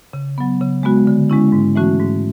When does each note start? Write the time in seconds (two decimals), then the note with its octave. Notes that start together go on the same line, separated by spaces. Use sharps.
0.13 C#3
0.38 F#3 B3
0.61 C#3
0.83 G#3 B3 F#4
1.07 D3
1.30 G#3 C#4 E4
1.52 G#2
1.76 E3 A3 C#4 F#4
2.00 G#2